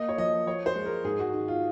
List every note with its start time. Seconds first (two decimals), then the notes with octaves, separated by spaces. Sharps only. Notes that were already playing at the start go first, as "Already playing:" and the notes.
Already playing: A#3 D#5
0.09 C#5
0.18 F3 D#5
0.46 F3 C#5
0.66 C5
0.76 G#3
0.85 A#4
1.04 G#2 G#4
1.19 F#4
1.34 D#3
1.48 F4